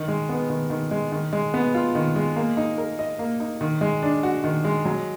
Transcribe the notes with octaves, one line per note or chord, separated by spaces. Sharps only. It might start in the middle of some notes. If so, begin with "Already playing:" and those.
Already playing: D#3
G#3
B3
D#3
D#3
G#3
D#3
G#3
B3
F4
D#3
G#3
A#3
D#4
A#4
D#5
A#3
D#4
D#3
G#3
D4
F#4
D#3
G#3
F#3